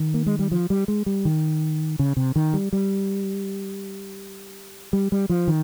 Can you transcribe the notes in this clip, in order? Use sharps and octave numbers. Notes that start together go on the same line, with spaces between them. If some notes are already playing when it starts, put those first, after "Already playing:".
Already playing: D#3
A#3
G#3
G3
F3
G3
G#3
G3
D#3
C#3
C3
D#3
G3
G3
G3
G3
F3
D#3